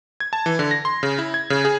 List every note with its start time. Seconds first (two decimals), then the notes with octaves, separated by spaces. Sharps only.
0.20 G#6
0.33 A5
0.46 E3
0.59 D3
0.71 A#6
0.85 C6
1.03 C#3
1.19 E4
1.34 G#6
1.50 C#3
1.65 G#4